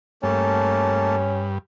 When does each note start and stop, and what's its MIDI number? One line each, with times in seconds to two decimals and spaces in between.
0.23 1.58 43
0.23 1.16 57
0.23 1.16 58
0.23 1.49 61
0.23 1.16 81